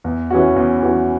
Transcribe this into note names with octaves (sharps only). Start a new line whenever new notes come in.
E2
E3 C#4 F#4
E2
E3 C#4 F#4